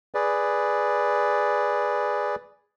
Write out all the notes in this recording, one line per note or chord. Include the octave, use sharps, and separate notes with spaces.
G#4 B4 D5